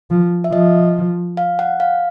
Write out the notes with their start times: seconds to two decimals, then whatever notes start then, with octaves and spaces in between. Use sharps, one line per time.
0.11 F3
0.44 E5
0.52 F3 D#5
1.37 F5
1.59 F#5
1.80 F5